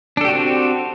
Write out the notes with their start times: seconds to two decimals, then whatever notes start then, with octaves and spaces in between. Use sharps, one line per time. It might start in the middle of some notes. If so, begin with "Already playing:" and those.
0.17 D4
0.21 A4
0.25 G4
0.28 F#4
0.32 C4